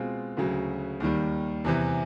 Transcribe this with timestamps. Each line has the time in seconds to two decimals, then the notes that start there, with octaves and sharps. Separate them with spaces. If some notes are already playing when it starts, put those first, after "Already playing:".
Already playing: B2 G#3 C4 F4
0.37 D2 C#3 F#3
1.00 D#2 D#3 G3
1.64 E2 C3 E3